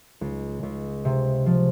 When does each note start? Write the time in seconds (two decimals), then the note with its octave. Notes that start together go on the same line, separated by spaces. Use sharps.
0.21 C#2
0.63 C#2
1.05 C3
1.46 F3